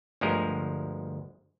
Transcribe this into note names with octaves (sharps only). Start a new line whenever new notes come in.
G1 D2 F3 G#3 A#4